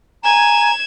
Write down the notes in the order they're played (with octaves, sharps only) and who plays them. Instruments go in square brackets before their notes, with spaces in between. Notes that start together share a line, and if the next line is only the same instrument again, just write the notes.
[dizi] G#5 [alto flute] A#5 [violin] G#6 E7